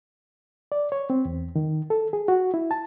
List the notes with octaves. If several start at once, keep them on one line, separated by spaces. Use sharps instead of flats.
D5
C#5
C4
E2
D#3
A4
G#4
F#4
E4
A5